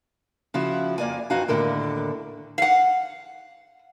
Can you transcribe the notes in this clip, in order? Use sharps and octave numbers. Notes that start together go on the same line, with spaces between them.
C#3 F3 E4 F#4
F2 A#3 D5 G#5
F2 E3 D#4 F#4 F5 G#5
D#2 A2 D3 A4 A#4
F5 F#5